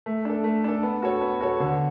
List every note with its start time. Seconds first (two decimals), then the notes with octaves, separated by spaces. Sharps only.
0.06 A3
0.25 D4 A4
0.44 A3
0.64 D4 A4
0.83 B3
1.02 F#4 A4 C#5
1.21 B3
1.41 F#4 A4 C#5
1.60 D3